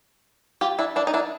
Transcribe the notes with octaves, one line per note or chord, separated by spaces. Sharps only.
F4 G4
D4 E4
D4 E4
D#4
D4 E4